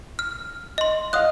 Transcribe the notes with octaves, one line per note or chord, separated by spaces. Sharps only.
F6
D#5 C6
D#5 F5 D#6 F#6